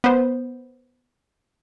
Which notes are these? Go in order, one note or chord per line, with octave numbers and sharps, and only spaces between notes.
B3 C5